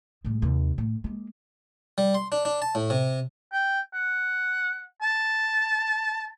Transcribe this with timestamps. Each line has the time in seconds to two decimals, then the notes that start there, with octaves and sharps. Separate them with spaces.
0.25 A2 G#3
0.42 D#2 C3
0.78 A2
1.04 G#3 A#3
1.98 G3
2.14 C6
2.32 D4
2.45 D4
2.62 A5
2.75 A2
2.90 C3
3.52 G5
3.94 F#5
5.02 A5